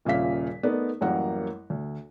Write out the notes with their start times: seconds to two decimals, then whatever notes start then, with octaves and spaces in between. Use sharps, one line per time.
0.05 D#1 A#2 C#3 E5 F5 B6
0.63 A3 B3 D#4 A#4 D5
1.01 A1 F#2 G3 A#3 A#4 F#5
1.70 D2